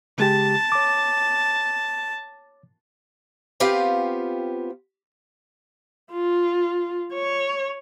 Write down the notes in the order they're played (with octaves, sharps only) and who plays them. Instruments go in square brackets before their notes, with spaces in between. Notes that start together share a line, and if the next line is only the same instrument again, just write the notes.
[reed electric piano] C#3 G#3 G4 [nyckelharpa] A5
[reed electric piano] C#5 D6
[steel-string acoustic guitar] B3 C4 F4 G4 B4 F5
[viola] F4
C#5